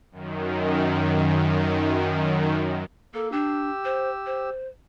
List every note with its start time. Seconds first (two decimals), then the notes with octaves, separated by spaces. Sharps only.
0.11 F#2 D#3
3.14 A#3 A4
3.32 D4 G4 E6
3.85 C5
4.26 C5